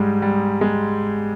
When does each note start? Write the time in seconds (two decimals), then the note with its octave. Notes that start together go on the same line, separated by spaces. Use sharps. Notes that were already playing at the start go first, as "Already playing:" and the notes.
Already playing: G#2 G3 G#3
0.22 G3
0.61 G#3